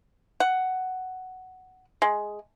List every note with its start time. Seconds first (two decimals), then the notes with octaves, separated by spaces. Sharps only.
0.40 F#5
2.02 G#3